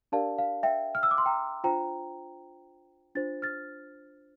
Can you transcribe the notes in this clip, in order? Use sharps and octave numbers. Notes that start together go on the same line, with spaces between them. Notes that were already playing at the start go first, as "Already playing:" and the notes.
D4 G4 A#4 D5 F5 A5
F5
E5 G5
F6
E6
D6
C6
G5 A#5
D4 F4 C5 G5 A#5
D4 F4 C5 A6
F6 A6